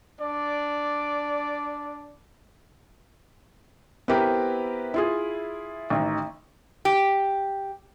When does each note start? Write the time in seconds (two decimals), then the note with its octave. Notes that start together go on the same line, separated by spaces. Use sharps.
0.20 D4 D5
4.08 B3 C4 E4 G4 A#4 B4
4.94 E4 F4 G#4
5.90 A1 D#3
6.85 G4